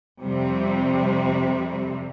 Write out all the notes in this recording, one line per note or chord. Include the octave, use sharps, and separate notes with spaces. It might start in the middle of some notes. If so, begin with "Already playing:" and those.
F2 C3 G3